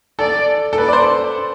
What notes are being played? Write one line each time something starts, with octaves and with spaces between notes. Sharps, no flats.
A4 D5
A4
B4 D5
D5
C5